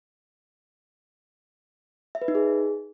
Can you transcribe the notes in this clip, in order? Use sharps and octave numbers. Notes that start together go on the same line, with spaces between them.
E5
B4
D#4
G#4